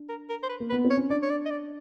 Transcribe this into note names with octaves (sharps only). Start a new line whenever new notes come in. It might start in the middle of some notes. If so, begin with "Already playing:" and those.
Already playing: D4
A#4
A#4
C5
B4
A#3
B4
B3
C4
C#5
C#4
D4 D5
C#5
D5
D#5
D5